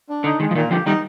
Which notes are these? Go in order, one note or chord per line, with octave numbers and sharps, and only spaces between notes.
D4
D3 D#4
D#3 G#3
F3
A#2 D#3
D3 F3 G4
D#3 G3 D#4